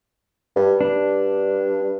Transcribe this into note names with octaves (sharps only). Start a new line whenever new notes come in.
G2
G2 D4